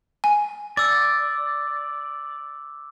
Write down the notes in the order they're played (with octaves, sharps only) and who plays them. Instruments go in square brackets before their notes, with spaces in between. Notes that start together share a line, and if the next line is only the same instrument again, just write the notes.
[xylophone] G#5
[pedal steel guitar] D5 [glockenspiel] D6 E6